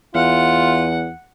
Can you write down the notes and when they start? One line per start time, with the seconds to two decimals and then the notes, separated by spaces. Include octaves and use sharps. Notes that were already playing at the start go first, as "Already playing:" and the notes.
0.15 E2 F4 F#5